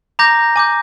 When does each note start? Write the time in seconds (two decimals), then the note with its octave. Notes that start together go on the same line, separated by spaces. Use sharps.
0.19 A#5 D6 G6 A#6
0.56 G#5 D6 G6